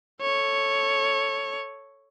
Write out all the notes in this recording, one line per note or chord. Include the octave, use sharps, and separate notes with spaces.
A4 C#5